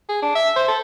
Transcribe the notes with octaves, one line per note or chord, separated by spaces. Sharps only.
G#4
D4
E5
C5
A4